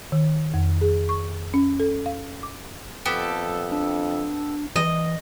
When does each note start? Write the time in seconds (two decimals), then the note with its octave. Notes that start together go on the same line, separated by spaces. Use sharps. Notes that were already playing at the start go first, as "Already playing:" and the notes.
0.12 D#3
0.54 F2
0.81 G#4
1.09 C#6
1.54 C#4
1.80 A4
2.06 F5
2.43 D6
3.06 F2 B3 G4 A4
3.72 D4
4.76 E3 D#5